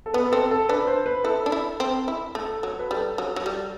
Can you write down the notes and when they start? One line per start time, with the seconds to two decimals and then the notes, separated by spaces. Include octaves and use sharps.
0.06 A4
0.14 B3 B4
0.32 C4 A4
0.51 A4
0.69 D4 B4
0.87 C5
1.06 B4
1.24 E4 A4
1.46 D4
1.52 E4
1.80 C4
2.08 E4
2.35 A3 A4
2.63 F#3
2.79 B4
2.90 G3 A4
3.18 F#3
3.36 F#3
3.46 G3